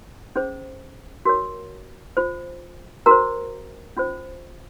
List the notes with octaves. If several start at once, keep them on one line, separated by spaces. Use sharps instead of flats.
C#4 G#4 C5
F#4 A#4 C#5
F4 C5
F#4 A#4 C5 A#5
C#4 F4 C5